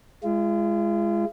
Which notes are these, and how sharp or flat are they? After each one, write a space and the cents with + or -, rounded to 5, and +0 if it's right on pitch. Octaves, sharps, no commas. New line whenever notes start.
G#3 +0 F4 -40